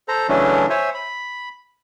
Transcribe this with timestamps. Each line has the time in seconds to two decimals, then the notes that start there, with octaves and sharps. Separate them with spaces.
0.08 A4 C5 A#5
0.29 C#3 E3 F#3 A3 C#4 D4
0.70 C5 C#5 E5 G#5
0.94 B5